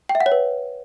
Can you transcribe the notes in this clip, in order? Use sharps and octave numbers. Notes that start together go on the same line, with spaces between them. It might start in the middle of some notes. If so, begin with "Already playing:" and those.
G5
E5
F#5
C#5
B4